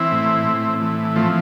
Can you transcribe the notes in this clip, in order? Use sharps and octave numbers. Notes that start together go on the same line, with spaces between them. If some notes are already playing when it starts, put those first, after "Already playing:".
Already playing: E3 C4 E4
A2
A2
E3
F3 A3 C4